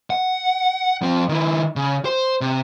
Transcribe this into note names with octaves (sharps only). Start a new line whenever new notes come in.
F#5
F3 C4
D#3 E4
C#3
C5
C3